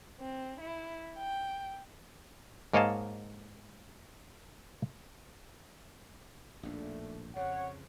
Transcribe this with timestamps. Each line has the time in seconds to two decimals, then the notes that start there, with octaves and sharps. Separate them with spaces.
0.19 C4
0.60 E4
1.16 G5
2.73 G#2 A#3 C#5 D#5 F5 A5
6.63 A#1 D#2 A2 A3 D4
7.36 F2 C#3 C#5 F#5